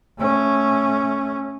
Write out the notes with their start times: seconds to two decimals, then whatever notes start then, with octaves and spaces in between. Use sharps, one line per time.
0.18 A3 C#4